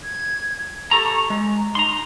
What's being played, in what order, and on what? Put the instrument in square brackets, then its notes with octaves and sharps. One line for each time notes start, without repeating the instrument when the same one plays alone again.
[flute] G#6
[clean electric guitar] G4 A4 A#5 [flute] C#6
[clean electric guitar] G#3 [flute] A#5
[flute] D#4 [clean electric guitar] A#5 C6